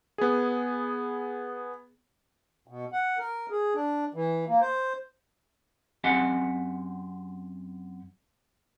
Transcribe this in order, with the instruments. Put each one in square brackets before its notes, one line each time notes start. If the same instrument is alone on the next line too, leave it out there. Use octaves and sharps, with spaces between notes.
[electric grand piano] B3 G#4
[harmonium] B2
F#5
A#4
G#4
D4
E3
A#3
C5
[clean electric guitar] F#2 C4 G4 E5 F#5 G#5